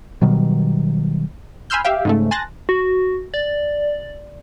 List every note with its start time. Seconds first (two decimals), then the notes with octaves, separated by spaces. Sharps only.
0.21 B2 D#3 F#3 G3
1.70 G#5 B5 C6 E6 F6 G6
1.84 G4 E5 F5 G5
2.05 G#2 C#3 A3
2.31 G#5 A5 C6 F#6 A6 A#6
2.69 F#4
3.34 D5